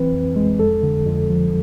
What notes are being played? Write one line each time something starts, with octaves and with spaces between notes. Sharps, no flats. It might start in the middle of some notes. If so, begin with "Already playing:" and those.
Already playing: E3 C4 B4
F2
G#3
F2 A4
D3
F2
F3